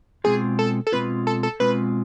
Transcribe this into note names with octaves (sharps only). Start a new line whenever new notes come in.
B2 G#3 C4 F4 G#4
A4
A4
B2 G#3 C4 F4 B4
A4
A4
B2 G#3 C4 F4 B4